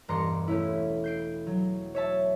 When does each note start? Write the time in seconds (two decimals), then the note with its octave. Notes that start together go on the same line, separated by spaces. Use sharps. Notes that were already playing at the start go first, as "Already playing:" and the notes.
0.08 E1 G2 A#5 C6 D6 C#7
0.48 A3 C#4 E4
1.04 G6 C7 D7
1.47 F#3
1.95 C#5 E5 A5